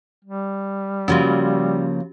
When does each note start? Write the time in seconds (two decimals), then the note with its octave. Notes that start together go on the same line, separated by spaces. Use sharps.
0.25 G3
1.08 C#3 F3 A#3 C#4 F#4 G4